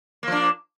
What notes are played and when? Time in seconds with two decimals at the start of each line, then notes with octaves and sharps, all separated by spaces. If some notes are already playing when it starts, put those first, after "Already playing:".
0.23 A#3
0.27 F3
0.32 D4